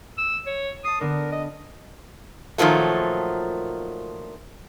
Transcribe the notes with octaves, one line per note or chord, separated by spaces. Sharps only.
E6
C#5
A5 D#6 C7
D3 B3 D4 A#4
D#5
A#2 D#3 F3 F#3 A3